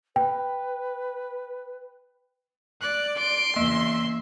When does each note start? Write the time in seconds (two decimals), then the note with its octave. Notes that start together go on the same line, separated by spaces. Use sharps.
0.16 B4 G5
2.82 D5 F#6
3.18 C6 D7
3.56 E2 C#3 A#3 E5